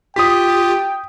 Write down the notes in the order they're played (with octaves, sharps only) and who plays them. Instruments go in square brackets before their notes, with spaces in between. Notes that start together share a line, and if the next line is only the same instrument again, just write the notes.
[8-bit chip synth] F4 G4 [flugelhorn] G5 [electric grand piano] D#6 B6